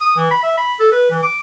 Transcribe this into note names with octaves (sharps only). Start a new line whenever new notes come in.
D#6
E3
B5
E5
B5
A4
B4
E3
D6